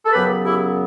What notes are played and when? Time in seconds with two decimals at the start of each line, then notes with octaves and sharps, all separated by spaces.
0.06 A4
0.13 F#2 C#3 F#3 B3 G4 B4
0.44 E4 G4